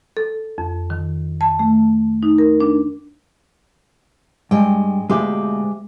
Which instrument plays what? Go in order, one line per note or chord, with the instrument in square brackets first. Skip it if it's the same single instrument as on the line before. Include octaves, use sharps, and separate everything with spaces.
[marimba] A4
F2
D#3
A5
A3
D#4
A#4
D4
[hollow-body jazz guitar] G2 [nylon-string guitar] G#3 G5
[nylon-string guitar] D2 B2 F5 [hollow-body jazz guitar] G#3 G4 E5